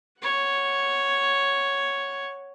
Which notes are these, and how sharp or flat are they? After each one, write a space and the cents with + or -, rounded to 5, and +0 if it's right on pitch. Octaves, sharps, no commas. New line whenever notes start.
C#5 +0 F#5 +0